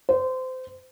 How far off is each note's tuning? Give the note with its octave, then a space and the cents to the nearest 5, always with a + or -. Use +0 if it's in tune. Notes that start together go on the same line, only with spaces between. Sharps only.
C5 -25